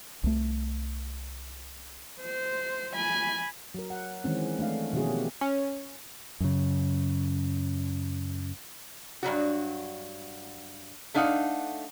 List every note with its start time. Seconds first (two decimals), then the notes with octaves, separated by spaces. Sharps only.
0.24 C2 A3
2.22 C5
2.95 G#5 B5
3.75 F#3 A#4
3.90 F#5
4.24 D#3 E3 G#3 C4 C#4
4.59 A3 D4 F5
4.93 B2 D#3 F3 C#4 F#4 G#4
5.09 G4
5.41 C#4
6.40 F#2 C#3
9.23 G2 B2 F#3 F#4
11.14 A3 D4 D#4 F5 F#5